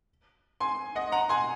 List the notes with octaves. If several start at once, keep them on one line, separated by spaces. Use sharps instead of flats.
G#5 C6
D#5 F#5
F#5 A#5
G#5 C6